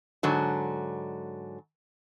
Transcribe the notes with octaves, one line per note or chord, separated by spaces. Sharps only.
G#2 D3 F#3